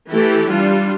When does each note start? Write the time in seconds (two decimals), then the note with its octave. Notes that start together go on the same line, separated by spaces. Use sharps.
0.11 E3 A3 E4 G4
0.50 G3 D4 F4